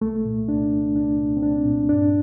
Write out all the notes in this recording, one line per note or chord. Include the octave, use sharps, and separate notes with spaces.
C2 A3
A#2
C2 D4
A#2
C2 D4
A#2
C4
C2 D4
A#2
G2 D4